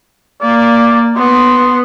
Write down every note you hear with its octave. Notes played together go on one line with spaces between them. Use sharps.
A#3 D5
B3 C6